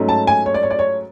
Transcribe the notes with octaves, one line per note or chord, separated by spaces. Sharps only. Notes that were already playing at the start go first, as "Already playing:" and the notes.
Already playing: G#2 F#3 A3 C#4
A5
G#5
C#5
D5
C#5
D5
C#5